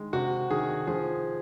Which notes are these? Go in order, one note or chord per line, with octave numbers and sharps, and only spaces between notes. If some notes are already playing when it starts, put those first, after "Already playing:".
Already playing: D#3 G#3
C3 F#4
D#3 G#4
F3 G#4